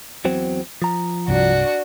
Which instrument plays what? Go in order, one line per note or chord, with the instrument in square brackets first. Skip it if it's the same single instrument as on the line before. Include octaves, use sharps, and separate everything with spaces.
[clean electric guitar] E2 F#3 C4
F3 A#5
[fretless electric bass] C2 G2 C3 [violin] D4 F#4